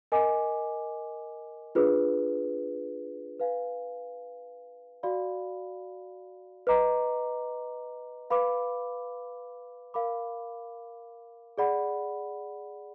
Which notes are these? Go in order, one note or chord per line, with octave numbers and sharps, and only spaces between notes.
A#4 D#5 G#5 D6
D4 F4 G#4 B4
B4 F5 G#5
F#4 D5 F5 B5
B4 D#5 A#5 D6
B4 F5 B5 D6
A#4 F5 B5 D6
G#4 D5 F#5 B5